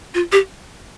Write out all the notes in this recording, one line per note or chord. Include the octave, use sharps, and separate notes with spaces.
F4
G4